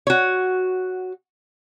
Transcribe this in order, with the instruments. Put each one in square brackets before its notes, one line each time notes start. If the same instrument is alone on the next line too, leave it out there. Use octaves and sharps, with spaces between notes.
[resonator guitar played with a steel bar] F#4 C#5